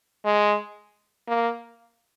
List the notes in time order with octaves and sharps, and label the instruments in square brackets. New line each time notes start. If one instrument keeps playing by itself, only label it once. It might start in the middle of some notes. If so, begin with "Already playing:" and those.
[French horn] G#3
A#3